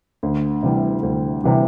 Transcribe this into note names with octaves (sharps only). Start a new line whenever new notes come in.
D2
C3 E3 G3
D2
C3 E3 G3